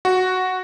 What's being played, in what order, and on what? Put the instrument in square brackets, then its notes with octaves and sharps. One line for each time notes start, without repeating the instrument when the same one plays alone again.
[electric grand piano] F#4